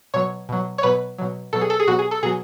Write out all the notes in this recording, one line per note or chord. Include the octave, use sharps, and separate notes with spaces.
B2 F#3 C#5
B2 F#3
C#5
B2 F#3 B4
B2 F#3
B2 F#3 A4
G#4
A4
G#4
B2 F#3 F#4
G#4
A4
B2 F#3 G#4